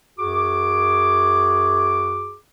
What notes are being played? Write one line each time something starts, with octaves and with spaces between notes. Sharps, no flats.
F#2 F#4 G#4 D6